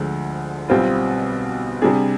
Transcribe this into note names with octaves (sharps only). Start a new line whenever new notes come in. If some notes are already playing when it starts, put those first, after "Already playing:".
Already playing: D2 D3 F3 G#3
B1 B2 G3 C4 F4
C3 G3 D4 G#4